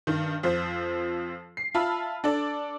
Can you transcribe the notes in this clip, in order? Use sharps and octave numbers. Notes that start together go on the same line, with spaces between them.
G2 D#3
F2 F3 C5
C7
F4 E5 A5 B5 F6
D4 A4 D5